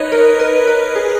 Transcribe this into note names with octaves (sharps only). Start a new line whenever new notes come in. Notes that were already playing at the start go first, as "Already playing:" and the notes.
Already playing: D#4 B4 C#5 D#5
A#4
B4
A#4
G#4